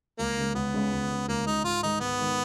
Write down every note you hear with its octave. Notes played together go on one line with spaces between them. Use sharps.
C#2 A#3
C#3 G#3
C#2 B3
C#3 G#3
C#2
C#3 G#3
C#2 A#3
C#3 G#3 D#4
G#2 F4
D#3 G#3 D#4
G#2 B3
D#3 G#3